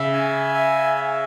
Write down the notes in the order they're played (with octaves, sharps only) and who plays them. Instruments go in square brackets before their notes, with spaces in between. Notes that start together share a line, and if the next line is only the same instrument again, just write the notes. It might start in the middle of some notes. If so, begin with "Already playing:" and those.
Already playing: [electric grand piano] C#3 [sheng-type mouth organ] E5
[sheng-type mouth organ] G#5
E5
E5